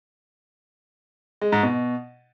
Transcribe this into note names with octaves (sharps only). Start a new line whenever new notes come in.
G#3
G#2
B2